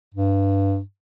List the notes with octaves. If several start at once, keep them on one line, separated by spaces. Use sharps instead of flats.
G2